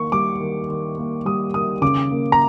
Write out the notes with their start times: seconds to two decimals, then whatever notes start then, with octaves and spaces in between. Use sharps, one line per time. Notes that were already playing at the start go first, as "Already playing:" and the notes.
Already playing: D#3 A#3 C#6
0.12 G3 D6
0.40 D#3
0.69 D#3
0.98 A#3
1.26 G3 D#6
1.54 D#3 D#6
1.82 C#3 D6
2.11 A#3
2.32 A#5